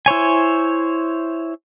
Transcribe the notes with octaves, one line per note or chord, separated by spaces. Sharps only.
E4 C5 C#5 G#5